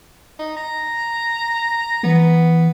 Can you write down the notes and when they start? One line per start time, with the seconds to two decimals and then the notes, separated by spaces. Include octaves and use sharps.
0.39 D#4
0.57 A#5
2.03 E3 B3